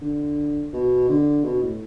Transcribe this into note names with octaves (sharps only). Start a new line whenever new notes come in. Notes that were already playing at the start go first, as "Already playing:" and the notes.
D3
B2
D3
B2
A2